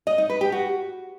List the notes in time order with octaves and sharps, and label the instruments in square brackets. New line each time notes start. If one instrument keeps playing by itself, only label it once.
[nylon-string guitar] D#5
D#4
B4
G4
F#4